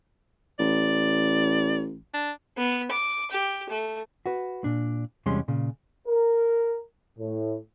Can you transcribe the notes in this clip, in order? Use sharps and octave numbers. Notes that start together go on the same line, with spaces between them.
A1 D5
D4
B3
D6
G4
A3
F#4 B4
A#2 D4
E2 C3 G3 G#3 C#4 C6
A#2 C#3
A#4
A2